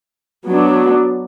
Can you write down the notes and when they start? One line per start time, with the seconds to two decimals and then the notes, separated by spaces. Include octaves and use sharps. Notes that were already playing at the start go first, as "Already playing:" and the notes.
0.47 F#3 B3 D4